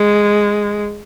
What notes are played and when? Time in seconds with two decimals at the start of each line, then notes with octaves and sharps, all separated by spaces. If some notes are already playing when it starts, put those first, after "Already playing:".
Already playing: G#3